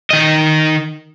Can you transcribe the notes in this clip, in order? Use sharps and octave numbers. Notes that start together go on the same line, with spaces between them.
D#3 D#5